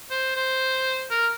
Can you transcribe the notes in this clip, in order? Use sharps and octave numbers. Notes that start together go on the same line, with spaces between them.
C5
C5
A#4